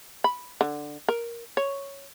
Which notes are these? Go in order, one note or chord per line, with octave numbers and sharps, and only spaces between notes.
B5
D3
A#4
C#5